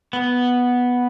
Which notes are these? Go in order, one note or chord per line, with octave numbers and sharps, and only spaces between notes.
B3